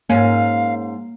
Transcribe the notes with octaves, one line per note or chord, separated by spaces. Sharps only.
G#2 A#3 C#4 F5